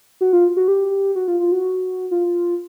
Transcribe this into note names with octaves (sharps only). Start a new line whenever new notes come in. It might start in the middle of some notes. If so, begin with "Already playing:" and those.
F#4
F4
F#4
G4
F#4
F4
F4
F#4
F4